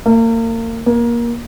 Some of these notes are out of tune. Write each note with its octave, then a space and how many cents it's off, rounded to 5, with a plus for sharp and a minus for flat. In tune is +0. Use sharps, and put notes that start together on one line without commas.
A#3 -35
A#3 +20